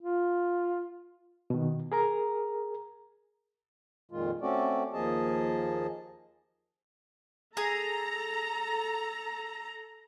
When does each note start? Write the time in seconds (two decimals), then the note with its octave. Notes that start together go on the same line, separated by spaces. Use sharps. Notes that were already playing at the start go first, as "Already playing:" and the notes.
0.01 F4
1.50 B2 D#3
1.92 G#4 A#4 A#5
4.11 F2 A#2 D#3 G#3 F4
4.41 A3 C4 C#4 F#4 A4 D5
4.93 D#2 F3 A#3 G#4 D#5 A5
7.57 G#4 A4 A#5